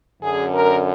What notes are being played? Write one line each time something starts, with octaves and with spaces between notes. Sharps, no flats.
F#2 D3 G#4
A#4